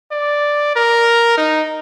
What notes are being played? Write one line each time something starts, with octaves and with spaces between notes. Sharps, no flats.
D5
A#4
D#4